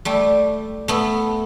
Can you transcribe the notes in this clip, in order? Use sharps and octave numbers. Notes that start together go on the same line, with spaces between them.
G3 A3
A3 B3